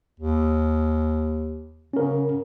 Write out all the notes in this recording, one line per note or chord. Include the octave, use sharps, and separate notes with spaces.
D#2
C#3 C#4 A#4